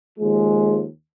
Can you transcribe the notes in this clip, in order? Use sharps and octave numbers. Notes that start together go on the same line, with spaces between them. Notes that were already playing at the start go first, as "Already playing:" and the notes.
D#2 F3 G#3